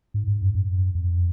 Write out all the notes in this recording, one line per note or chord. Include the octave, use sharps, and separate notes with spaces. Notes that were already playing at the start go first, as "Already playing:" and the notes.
G#2
G#2
F#2
F#2
F2